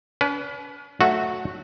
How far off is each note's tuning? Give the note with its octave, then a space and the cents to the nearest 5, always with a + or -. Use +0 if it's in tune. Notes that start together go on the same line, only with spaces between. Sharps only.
C#4 +45 B4 +5
F#3 +0 A3 +0 F#4 -10